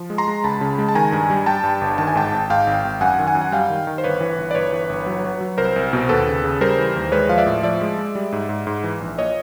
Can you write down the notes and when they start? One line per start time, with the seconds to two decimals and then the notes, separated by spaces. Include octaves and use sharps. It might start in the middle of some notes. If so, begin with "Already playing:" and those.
Already playing: F3
0.10 G#3
0.18 A#5 C6
0.28 G#3
0.44 C#2 A5 B5
0.61 C#3
0.78 G#3
0.89 A5
0.95 D#3 G#5 A#5
1.12 G2
1.30 G3
1.46 G3 G5 A5
1.64 G2
1.81 G1
1.98 D#3 A5
2.07 G#5
2.16 G#2 G5 A5
2.32 G#1
2.50 G#2 F5 G5
2.67 G#1
2.85 G#1
3.01 F#2 F#5 G#5
3.19 D#3
3.27 F#5 G#5
3.35 F#2
3.42 F#5
3.52 G3 F5 G5
3.69 D#3
3.87 D#3
3.98 C5
4.04 G1 B4 C#5
4.21 E3
4.38 G1
4.51 D5
4.55 G1 B4 C#5
4.72 E3
4.89 G1
5.06 F#3
5.24 F#3
5.41 F#3
5.58 C2 A#4 C5
5.76 C2
5.93 B2
6.09 D#2 A4 B4
6.27 C#3
6.44 C#3
6.61 G3 A#4 C5
6.79 E3
6.96 D#2
7.12 G#3 B4 C#5
7.29 F3 F5
7.38 D5 E5
7.46 A2
7.63 F3 D5 E5
7.81 G#3
7.98 G#3
8.15 G3
8.32 G#2
8.49 G#2
8.67 G#2
8.84 E3
9.00 A#1
9.18 A#2 C#5 D#5